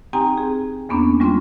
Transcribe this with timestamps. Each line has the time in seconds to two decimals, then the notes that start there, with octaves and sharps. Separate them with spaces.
0.13 C4 D#4 G4 G5 G#5 A#5
0.38 G#4
0.89 E2 A#3 B3 C#4 D4
1.20 G3 G#3 C#4 F4 C6